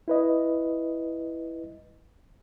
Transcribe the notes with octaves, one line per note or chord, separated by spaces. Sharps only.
E4 B4 D#5